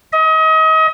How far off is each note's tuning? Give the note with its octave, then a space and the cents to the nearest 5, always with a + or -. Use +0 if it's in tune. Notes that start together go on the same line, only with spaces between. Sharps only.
D#5 +35